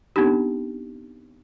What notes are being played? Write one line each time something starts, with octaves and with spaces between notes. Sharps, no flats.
B3 C4 D4 D#4 G4